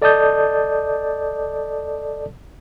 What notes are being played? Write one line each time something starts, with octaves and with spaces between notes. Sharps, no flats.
A4 D5 D#5 A5 D#6 G6